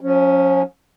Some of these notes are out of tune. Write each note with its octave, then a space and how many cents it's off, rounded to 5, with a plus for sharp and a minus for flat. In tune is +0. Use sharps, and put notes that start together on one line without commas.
F3 +45 C#4 +0